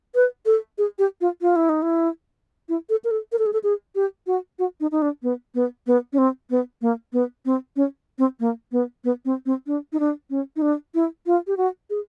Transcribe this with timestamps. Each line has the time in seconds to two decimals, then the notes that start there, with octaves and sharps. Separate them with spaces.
0.15 B4
0.46 A4
0.78 G#4
0.99 G4
1.21 F4
1.42 F4
1.56 E4
1.69 D#4
1.82 E4
2.69 E4
2.90 A4
3.04 A#4
3.11 A4
3.32 A#4
3.39 A4
3.46 G#4
3.53 A4
3.64 G#4
3.95 G4
4.27 F#4
4.59 F#4
4.80 D#4
4.92 D#4
5.02 D4
5.23 B3
5.55 B3
5.87 B3
6.13 C#4
6.18 C4
6.50 B3
6.82 A#3
7.13 B3
7.45 C4
7.76 C#4
8.18 C4
8.40 A#3
8.72 B3
9.04 B3
9.25 C4
9.46 C4
9.67 D4
9.93 D#4
10.00 D4
10.30 C#4
10.56 D#4
10.62 D4
10.95 E4
11.26 F4
11.47 G4
11.57 F#4
11.90 G#4